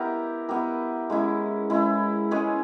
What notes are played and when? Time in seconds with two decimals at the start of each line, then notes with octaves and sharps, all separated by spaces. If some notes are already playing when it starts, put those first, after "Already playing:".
Already playing: B3 E4 G4 A#4
0.49 B3 E4 G4 A#4
1.10 G#3 C#4 E4
1.70 G#3 C#4 E4
2.31 G#3 C#4 G#4 B4